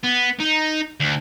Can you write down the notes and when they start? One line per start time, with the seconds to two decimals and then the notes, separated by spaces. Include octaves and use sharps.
0.04 B3
0.40 D#4
1.00 D2